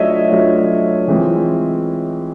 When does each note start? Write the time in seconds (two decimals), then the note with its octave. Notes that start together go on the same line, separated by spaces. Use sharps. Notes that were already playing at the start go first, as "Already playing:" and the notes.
Already playing: F#3 A3 D4 F4 C#5 D#5 E5
0.31 F#3 A3 D4 F4
1.08 E3 G#3 C4 F4